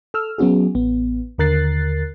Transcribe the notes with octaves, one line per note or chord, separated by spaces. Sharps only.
A4 E6 F6
F#3 B3 C#4 F#4 G#4
A1 B3
D#2 D3 A#4 F#6 A6 C7